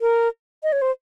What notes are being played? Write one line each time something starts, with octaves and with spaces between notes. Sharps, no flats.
A#4
D#5
C#5
C5